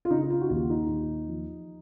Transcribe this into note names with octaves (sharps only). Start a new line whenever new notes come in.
F4
C#3 D#4
D#4
F4
F#4
D#2 F4
D#4
D#2
F3